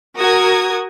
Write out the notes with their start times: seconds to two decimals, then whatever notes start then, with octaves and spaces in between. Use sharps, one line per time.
0.16 F#4 A#4 D#6 G#6